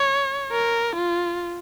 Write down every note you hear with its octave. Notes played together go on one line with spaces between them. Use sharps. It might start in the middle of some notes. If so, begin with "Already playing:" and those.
Already playing: C#5
A#4
F4